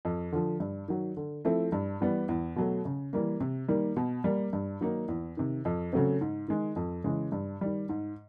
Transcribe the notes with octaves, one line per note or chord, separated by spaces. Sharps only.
F2
D3 F3
G2
D#3 F#3
D3
F3 A3 C4 E4
G2
E3 G3 B3
E2
B2 F#3 A3
C#3
E3 G3 A#3
C3
D#3 G3 A#3
B2
G3 A#3
G2
D#3 F#3 A#3 D#4
E2
C3 D#3
F2
C#3 F#3 A3 C4
G#2
D#3 G#3
F2
C#3 E3 G#3
G2
D#3 G3
G#2